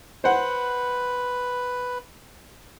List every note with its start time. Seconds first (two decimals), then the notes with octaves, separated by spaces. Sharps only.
0.24 B4 C5 F#5